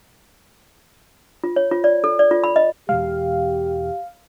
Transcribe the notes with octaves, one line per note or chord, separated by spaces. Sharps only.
F4
C#5
F4
D5
A4
D5
F4
B5
D#5
E2 B2 G#3 G4 F5